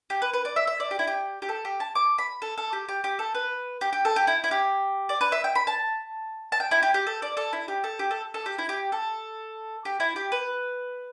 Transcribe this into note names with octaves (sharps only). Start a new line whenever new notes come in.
G4
B4
B4
D5
E5
E5
D5
G4
E4
G4
G4
A4
G4
A5
D6
B5
A4
A4
G4
G4
G4
A4
B4
G4
G4
A4
G4
E4
E4
G4
D5
B4
E5
G5
B5
A5
A5
G5
E4
G4
G4
A4
D5
A4
E4
G4
A4
G4
A4
A4
G4
E4
G4
A4
G4
E4
G4
B4